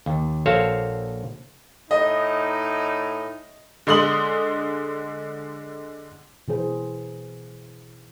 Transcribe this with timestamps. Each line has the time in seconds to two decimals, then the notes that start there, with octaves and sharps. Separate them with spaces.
0.06 D#2
0.46 A#1 F#4 A4 C5 C#5 F5
1.91 A2 D#4 D#5
3.87 D3 G#3 C6 D#6 F#7
6.48 B2 E3 G#4 C5